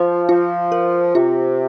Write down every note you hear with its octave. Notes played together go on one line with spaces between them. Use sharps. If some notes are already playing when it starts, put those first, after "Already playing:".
Already playing: F3 C5
F3 F4
A#4
C3 F4